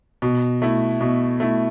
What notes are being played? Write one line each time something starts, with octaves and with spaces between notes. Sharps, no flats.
B2
A3 E4
B2
A3 E4